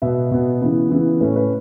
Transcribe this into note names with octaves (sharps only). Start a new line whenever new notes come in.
B2 B3 E5
B2 B3
C#3 E3 B3
C#3 E3 B3
A2 A3 C#4 B4
B4